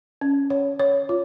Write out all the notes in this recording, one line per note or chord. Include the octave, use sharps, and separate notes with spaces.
C#4
C#5
C#5
F4